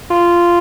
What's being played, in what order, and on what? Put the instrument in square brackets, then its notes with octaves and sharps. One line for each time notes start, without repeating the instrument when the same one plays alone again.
[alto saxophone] F4